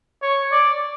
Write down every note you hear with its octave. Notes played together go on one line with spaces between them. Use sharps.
C#5
D5